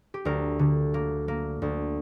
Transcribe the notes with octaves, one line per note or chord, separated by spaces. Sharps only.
G4
D2 A#4
D3
A#3
A#3
D2